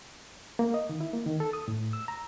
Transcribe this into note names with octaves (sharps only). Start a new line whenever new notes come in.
A#3
D#5
D#3
E4
A#3
D#3
A4
D#6
A2
E6
A#5